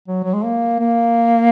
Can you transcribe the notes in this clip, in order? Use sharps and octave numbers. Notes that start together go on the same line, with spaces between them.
F#3
F#3
G#3
A#3
A#3